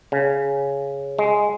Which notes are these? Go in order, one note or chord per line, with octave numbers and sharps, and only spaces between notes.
C#3
G#3